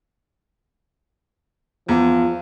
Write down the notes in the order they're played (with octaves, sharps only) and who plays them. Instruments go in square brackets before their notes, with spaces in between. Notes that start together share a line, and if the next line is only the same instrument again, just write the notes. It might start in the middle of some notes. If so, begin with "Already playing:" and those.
[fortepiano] E2 [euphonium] F3